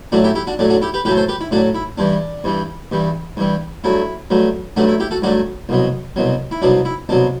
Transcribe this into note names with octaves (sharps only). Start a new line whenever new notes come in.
A2 F#3 A3 D4 F#4
E4 G4
E4 G4
D4 F#4
A2 F#3 A3 D4
D4 F#4
E4 G4
G4 B4
A2 F#3 A3 G4 B4
A4 C5
G4 B4
E4
A2 F#3 A3 D4 F#4
E4
G2 E3 G3 D4
G2 E3 G3
G2 E3 G3
G2 E3 G3
G2 F#3 A3 E4
G2 F#3 A3
G2 F#3 A3 D4 F#4
E4
E4 G4
F#4 A4
G2 F#3 A3 D4 F#4
C2 B2 F#3
C2 B2 F#3
E4
C2 B2 F#3 D4
E4
C2 B2 F#3 D4